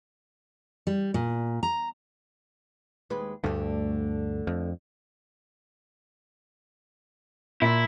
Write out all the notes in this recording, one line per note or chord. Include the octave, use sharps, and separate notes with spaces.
G3
A#2
A#5
D#2 G#3 B4
D2 G2 D3 A3
F2
A#2 E4